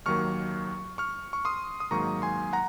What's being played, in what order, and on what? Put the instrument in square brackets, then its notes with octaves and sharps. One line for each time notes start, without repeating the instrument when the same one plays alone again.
[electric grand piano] D#2 D#3 F#3 A#3 C#6 F6
C#6 F6
C#6
C6 D#6
D#6
G#2 D#3 F#3 A#3 A#5 C#6
G#5 C6
F#5 A#5